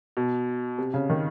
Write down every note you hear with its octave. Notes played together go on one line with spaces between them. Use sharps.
B2
C3
C#3
D#3